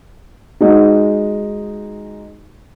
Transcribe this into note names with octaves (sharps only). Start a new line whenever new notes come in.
G#3 D#4 F#4